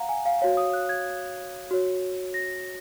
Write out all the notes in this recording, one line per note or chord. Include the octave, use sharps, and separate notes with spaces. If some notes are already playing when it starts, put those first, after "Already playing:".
Already playing: F5 F#5 A#5
G#5
F5
F#4 C#5 F5
D#6
F#6
G#6
F#4 C#5
A#6